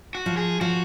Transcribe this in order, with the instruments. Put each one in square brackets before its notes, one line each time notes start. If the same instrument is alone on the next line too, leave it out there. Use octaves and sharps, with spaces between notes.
[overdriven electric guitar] F#4
[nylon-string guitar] F3
[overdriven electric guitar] G#4
[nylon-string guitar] F3 [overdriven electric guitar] F#4